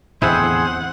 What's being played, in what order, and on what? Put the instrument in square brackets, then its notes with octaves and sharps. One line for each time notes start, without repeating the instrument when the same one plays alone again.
[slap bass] E2 A2 D3 [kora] C4 E4 [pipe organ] G#4 C5 [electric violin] F#5